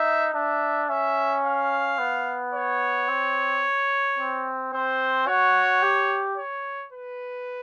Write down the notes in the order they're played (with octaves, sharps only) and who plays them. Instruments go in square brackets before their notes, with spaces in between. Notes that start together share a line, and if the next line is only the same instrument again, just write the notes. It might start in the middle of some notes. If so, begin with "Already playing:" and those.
Already playing: [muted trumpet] D#4 [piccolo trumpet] E5
[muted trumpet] D4 [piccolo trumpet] E5
[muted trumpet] C#4 [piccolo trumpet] E5
[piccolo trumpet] F5
[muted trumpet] B3
[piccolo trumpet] C#5
[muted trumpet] C4
C4
[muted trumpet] C4 [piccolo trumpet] C5
[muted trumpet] F#4 [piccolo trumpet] C#5
[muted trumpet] G4
[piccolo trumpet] C#5
B4